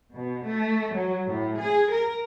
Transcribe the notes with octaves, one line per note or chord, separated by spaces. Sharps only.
B2
A3
F#3
A2
G#4
A#4